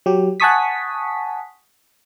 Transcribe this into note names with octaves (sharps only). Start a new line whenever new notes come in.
F#3 G4
F#5 G#5 A5 C#6 D#6 B6